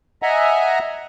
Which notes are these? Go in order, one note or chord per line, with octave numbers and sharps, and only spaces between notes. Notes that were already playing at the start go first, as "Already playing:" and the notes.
D#5 E5 F#5 G#5 A#5